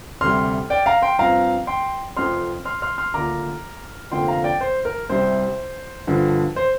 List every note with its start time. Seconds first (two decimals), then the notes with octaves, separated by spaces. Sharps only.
0.21 D2 C3 G3 C6 F6
0.70 D5 G5
0.86 F5 A#5
1.02 G5 C6
1.18 G2 F3 C4 F5 A#5
1.67 G5 C6
2.17 F1 F2 F3 C4 C6 F6
2.65 C6 F6
2.82 C6 F6
2.98 C6 F6
3.14 D2 D3 A#3 D4 F4 A#5 D6
4.12 F1 F2 D3 F3 A#3 G5 C6
4.28 F5 A#5
4.44 D5 G5
4.61 C5
4.85 A#4
5.09 C2 C3 G3 C5
6.07 G2 D3 F3
6.56 C5